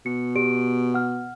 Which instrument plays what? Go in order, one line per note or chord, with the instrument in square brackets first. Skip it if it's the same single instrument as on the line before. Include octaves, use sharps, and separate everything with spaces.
[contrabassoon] B2 [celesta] C#7
[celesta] G4 D5 D7
F#5 F6